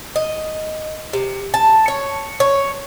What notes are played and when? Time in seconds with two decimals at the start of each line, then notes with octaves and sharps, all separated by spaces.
0.16 D#5
1.13 C3
1.54 A5
1.88 C#5
2.40 C#5